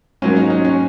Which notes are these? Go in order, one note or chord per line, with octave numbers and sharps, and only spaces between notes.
G#2 F#3 A#3 C#4
D#4
C#4
C#4